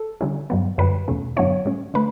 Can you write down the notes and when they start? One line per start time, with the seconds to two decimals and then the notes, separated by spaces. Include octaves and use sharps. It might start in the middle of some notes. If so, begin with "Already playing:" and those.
Already playing: A4
0.21 D3 G3 C#4 E4
0.50 G2 F#3 B3
0.78 F#2 D3 G3 B4
1.08 E2 B2 A3 C#4
1.36 G2 D3 F#3 B3 E4 C#5
1.65 A2 G3 C#4
1.94 D3 A3 B4